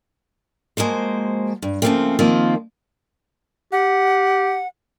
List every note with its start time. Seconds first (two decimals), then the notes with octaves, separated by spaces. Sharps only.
0.77 F3 G#3 A#3 F#4 C5
1.62 G2
1.82 C#3 F3 F#3 A3 A#3 C4
2.19 D#3 F3 A#3 C4 F4
3.72 G4 F#5